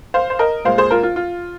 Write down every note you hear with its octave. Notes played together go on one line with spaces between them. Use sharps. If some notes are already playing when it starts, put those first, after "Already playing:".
C5 F5
C5
A#4 D#5
A#2 G#3 C5 F5
G#4 C5
F4 A#4
F4
F4